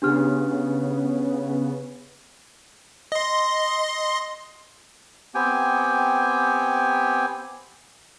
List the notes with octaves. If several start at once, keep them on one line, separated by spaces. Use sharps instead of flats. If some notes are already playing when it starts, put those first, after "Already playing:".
C#3 B3 D4 G4 F6
D#5 C6
B3 C4 G4 G5 G#5